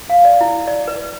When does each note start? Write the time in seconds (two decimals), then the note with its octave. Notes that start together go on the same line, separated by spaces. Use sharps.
0.10 F5
0.25 D5
0.41 E4
0.67 D5
0.88 B4